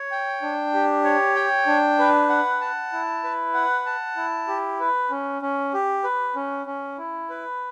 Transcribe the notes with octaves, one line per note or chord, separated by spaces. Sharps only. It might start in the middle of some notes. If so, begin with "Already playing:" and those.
Already playing: C#5
G5
D4
G4
C#5
G5
D4
B4
F#5
A5
E4
B4
F#5
A5
E4
G4
B4
C#4
C#4
G4
B4
C#4
C#4
E4
B4